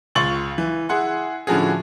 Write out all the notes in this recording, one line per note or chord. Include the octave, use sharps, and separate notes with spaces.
C#2 F4 C6 C#6 A6 F#7
E3
E4 G#4 F#5 C6
A2 D3 F3 C#4 F#4 G#4